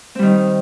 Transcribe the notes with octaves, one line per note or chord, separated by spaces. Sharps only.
D#3 G3 C4